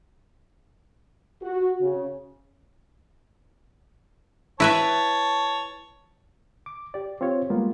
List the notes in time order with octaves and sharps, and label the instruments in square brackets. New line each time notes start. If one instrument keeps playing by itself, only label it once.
[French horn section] F#4
C#3
[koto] E4 B4 E5 [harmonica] C#5 A5
[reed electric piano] D6
G4 D5
C4 F4 G4 C#5
G3 G#3 A#3 B3 F4 G4